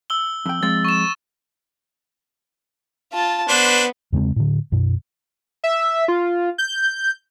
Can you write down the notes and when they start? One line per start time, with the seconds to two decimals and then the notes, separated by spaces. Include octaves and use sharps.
0.10 E6 G7
0.46 F2 G5
0.63 F3 G#3 C4 A6
0.85 C#6 E7
3.13 F4 A5
3.49 B3 D4 B4 C5
4.12 E2 C#3 G#3 C4
4.36 A2 D3
4.72 F#2 B2
5.64 E5
6.08 F4
6.58 G6